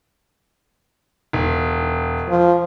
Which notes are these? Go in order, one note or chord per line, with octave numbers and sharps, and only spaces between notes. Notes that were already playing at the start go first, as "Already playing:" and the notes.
E1
F3